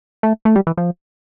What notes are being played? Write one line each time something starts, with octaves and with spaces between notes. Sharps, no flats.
A3
A3
G3
E3
F3